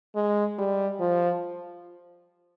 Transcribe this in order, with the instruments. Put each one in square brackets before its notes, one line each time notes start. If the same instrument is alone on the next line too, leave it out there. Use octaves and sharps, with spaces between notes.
[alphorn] G#3
G3
F3